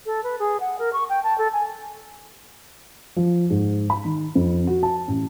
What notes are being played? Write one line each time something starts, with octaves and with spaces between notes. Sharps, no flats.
A4
B4
G#4
F#5
A#4
C#6
G5
A5
A4
G#5
F3
G#2
B5
D#3
F2
F#4
A5
A1